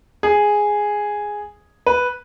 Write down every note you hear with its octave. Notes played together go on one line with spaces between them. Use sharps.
G#4
B4